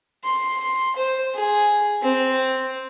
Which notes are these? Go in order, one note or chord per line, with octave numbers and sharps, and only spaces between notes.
C6
C5
G#4
C4